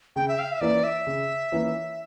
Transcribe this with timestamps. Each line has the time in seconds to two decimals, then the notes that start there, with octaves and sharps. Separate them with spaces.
0.16 C#3 G5
0.28 E5
0.39 F5
0.52 E5
0.61 E3 A#3 C#4 E4 D5
0.84 E5
1.07 C#3
1.52 E3 A#3 C#4 E4